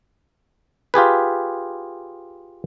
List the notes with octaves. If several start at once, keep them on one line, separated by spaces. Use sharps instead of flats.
F4 G4 G#4 B4